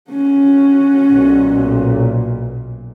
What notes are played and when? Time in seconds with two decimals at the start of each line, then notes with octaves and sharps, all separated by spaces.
0.11 C#4 F#4
1.12 B1 A#2